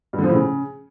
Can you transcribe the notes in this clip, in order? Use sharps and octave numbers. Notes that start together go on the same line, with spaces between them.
G2
D3
F3
A2
C#3